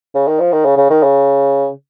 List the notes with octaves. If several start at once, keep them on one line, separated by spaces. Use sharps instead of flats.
C#3
D#3
F3
D#3
C#3
C#3
D#3
C#3